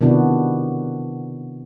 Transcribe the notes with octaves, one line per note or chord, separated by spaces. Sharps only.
C3 D#3 B3 D4 E4 F#4